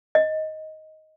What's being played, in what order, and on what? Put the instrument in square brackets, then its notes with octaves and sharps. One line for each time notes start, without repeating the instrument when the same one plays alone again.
[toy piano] D#5